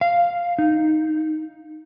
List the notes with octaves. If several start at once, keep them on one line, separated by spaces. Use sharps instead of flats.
F5
D#4